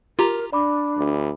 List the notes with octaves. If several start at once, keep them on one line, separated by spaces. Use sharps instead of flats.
F4 G4 A#4 A#5
D4 D5 B5 D6
D2